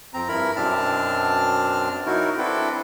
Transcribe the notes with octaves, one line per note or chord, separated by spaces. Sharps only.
F2 C4 A#5
G2 E4 A#4 B5
F#2 B2 C4 D4 A5 F6
F#3 D#4 E4 F#4 A#4
C4 D4 E4 A4 B4